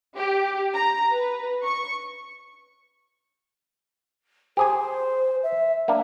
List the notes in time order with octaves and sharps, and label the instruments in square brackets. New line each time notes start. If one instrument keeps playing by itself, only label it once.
[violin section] G4
A#5
B4
C#6
[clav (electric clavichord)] G4 G#4 G#5 [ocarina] C5
[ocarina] E5
[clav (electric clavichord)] A#3 D4 [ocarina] E5